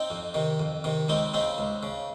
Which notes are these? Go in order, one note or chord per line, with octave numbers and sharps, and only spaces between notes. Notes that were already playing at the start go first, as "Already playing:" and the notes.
Already playing: C4 D#4
F2
C3 D#3
F2
C3 D#3
C#2 C4 D#4
C#3 C4 D#4
C#2
C#3